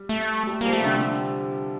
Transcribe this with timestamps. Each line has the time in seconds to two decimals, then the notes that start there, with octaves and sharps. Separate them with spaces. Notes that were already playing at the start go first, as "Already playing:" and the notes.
Already playing: G3
0.09 A3
0.47 G3
0.61 G3 A#3
0.66 F3
0.73 A3
0.81 C3
0.86 D3